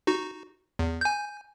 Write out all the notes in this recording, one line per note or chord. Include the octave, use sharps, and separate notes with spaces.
D#4 F#4
E2
G#5 G6